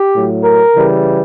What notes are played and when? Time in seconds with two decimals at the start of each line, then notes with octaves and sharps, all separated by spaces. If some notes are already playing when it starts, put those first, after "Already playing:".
Already playing: G4
0.13 A2 F#3
0.44 A#4
0.74 C#3 E3 G3